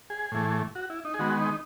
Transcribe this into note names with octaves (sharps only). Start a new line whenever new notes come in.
G#4
A2 E3 A3
F#4
E4
D#4
G#4
D#3 G#3 B3 F#4
D#4